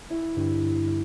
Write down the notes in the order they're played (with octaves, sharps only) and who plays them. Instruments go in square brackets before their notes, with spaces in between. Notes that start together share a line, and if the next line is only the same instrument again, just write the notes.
[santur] E4
[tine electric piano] G2 D3 G3